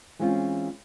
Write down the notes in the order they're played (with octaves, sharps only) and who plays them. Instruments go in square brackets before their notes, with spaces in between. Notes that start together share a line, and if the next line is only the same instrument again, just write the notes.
[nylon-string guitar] E3 G#3 C4 C#4 F4